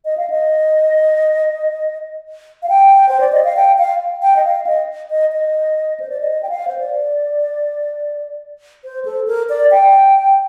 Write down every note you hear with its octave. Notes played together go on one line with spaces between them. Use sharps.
D#5
F5
D#5
F5
G5
C5
D5
D#5
F5
G5
F5
G5
D#5
F5
D#5
D#5
D#5
C5
D5
D#5
G5
F5
C5
D5
C5
A4
A#4
D5
G5